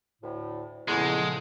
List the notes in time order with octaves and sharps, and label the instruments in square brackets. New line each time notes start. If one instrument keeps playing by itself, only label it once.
[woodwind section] D2 A2
[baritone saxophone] E2 [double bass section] A#2 C#3 F3 [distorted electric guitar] G#3 [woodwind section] G#4 A4 F#5